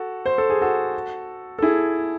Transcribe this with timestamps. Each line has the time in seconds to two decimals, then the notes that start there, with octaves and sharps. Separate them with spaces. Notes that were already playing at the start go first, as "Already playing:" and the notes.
Already playing: F#4 A4
0.26 C5
0.38 A4
0.50 G#4
0.62 F#4 A4
1.58 A4
1.62 E4 G#4